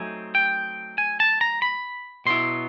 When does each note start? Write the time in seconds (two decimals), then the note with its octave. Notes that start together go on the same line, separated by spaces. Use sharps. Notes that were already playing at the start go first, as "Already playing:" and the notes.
Already playing: F#3 A3 C4 D#4 G#5
0.35 G5
0.98 G#5
1.20 A5
1.41 A#5
1.62 B5
2.26 B2 F#3 B3 E4 C6